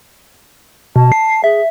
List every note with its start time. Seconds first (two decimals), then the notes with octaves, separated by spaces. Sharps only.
0.96 B2 A5
1.12 C7
1.44 G#4 E5